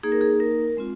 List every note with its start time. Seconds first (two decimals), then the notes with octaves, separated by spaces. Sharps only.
0.03 A#3 D#4 G#4
0.12 A#4
0.21 G#4
0.40 A#4
0.77 G#3 C4 F4